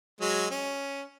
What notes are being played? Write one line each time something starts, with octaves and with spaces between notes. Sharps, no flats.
F#3 G#3
C#4